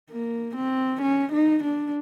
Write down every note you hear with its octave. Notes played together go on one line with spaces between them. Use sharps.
A#3
C4
C#4
D#4
D4